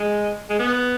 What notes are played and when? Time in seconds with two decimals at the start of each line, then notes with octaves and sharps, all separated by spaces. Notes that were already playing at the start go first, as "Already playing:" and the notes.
Already playing: G#3
0.50 G#3
0.59 B3